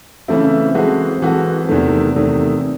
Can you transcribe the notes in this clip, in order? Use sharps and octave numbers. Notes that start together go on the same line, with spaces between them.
C#3 E3 A3 C4 E4
E3 G#3 C4 F#4 A4
E3 G#3 C4 F#4 A4
E2 C3 D#3 A3
E2 C3 D#3 A3